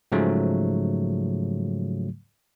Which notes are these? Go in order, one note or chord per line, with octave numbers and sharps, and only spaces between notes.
G#2 C#3 F3 F#3 A3